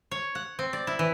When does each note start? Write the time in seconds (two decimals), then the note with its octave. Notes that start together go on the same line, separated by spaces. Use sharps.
0.11 C#5
0.35 F#5
0.59 C4
0.73 D5
0.87 E4
0.99 E3